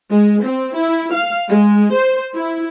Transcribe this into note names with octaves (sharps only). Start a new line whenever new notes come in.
G#3
C4
E4
F5
G#3
C5
E4